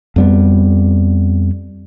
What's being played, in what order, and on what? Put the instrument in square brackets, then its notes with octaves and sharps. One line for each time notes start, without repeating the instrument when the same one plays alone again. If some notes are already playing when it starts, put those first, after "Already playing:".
[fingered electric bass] F2 G3 B3